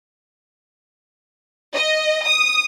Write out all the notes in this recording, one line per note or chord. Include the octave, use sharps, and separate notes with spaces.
D#5
D#6